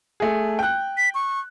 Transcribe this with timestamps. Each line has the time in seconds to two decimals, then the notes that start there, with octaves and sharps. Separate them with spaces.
0.20 A3 G#4
0.59 G5 F#6
0.97 B6
1.15 C#6